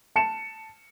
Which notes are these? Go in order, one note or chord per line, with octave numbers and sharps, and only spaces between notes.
A5 C#7 E7